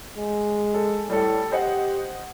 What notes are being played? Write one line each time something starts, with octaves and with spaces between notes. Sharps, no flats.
G#3
A4
A2 G3 A4
G4 C5 D#5 F#5